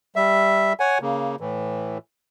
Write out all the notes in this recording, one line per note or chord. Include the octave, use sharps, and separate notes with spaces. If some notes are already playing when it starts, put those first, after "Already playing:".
G3 E5
C#5 F#5 G#5
C#3 A#3
A2 E3